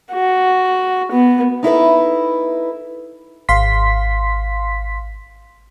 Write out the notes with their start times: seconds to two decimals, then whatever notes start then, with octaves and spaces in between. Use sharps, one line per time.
0.13 F#4
1.11 B3
1.63 D#4 E4 A4 B4
3.49 G#1 F5 C6 B6